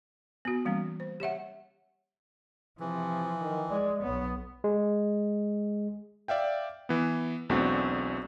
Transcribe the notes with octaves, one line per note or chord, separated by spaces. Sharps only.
B3 F#4
E3 G3 A#3 C#4
C5
G4 C#5 E5 F#5
C3 E3 F3
D#3
G#3 D5
B1 B3 C#5
G#3
D5 E5 F5 G5
E3 B3
B1 E2 A3 C4 D4 F#4